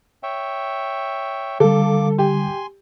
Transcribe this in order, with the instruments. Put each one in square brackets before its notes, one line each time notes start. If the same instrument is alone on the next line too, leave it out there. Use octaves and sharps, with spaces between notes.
[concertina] C#5 E5 G5
[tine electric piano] D3 G3 [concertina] A#3 D6 [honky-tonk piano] A4
[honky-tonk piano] G4 [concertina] G#5 C6